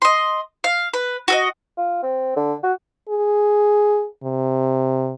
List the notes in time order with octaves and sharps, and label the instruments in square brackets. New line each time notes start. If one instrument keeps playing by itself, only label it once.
[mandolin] D#5 C6
F5
B4
F#4 A4 D#5
[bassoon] F4
C4
D3
F#4
[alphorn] G#4
C3